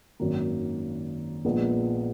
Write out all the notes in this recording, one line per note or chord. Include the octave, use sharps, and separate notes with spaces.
G#1 F#2 D#3 A#3
A#1 A#2 G#3 B3